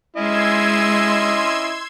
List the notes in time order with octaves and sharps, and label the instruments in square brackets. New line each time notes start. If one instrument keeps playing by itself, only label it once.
[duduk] G#3 [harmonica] C#4 E4 D#5 [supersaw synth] C6 E6 G#6